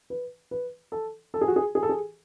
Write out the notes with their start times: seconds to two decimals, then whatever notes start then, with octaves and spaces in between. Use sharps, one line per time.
0.10 B4
0.51 B4
0.92 A4
1.34 A4
1.41 G#4
1.48 F#4
1.56 G#4
1.75 G#4
1.83 A4
1.89 G#4